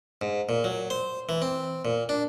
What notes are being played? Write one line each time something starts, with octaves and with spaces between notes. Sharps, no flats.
G#2
A#2
F#3
C5
E3
C4
A#2
D4